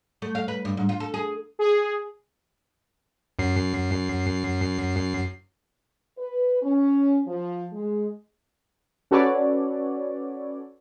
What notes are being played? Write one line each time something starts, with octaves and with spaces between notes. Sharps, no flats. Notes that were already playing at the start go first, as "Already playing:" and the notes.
A3
F5
B4
G2
G#2
F4
A4
G#4
G#4
F#2 C7
B4
C#4
F3
G#3
C#4 F#4 A4 B4 C#5 D5